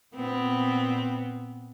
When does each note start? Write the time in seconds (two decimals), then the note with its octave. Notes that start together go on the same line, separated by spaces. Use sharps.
0.15 A#2 B3 C4